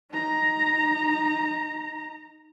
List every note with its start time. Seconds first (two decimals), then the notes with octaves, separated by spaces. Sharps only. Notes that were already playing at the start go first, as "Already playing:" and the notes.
0.11 D#4 A#5